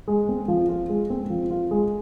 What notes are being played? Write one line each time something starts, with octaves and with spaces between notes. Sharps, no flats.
G#3
C4
F3
F4
G#3
C4
F3
F4
G#3